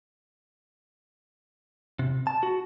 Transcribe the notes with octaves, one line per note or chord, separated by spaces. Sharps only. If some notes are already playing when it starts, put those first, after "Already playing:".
C3
A5
F#4